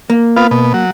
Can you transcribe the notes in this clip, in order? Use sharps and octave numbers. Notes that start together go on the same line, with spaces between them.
A#3
B3 F4
B2
F#3